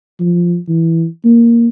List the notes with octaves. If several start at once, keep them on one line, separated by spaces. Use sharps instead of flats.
F3
E3
A#3